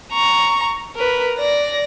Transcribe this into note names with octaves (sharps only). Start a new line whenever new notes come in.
A#5 C#6
A#4 B4
D5 A#6